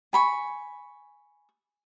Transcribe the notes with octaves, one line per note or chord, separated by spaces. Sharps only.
G#5 B5 C#6